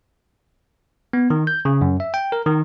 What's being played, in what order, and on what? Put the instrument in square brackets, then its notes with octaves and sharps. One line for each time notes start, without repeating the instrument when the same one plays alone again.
[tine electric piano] B3
D#3
G6
C#3
F#2
E5
G5
A#4
D#3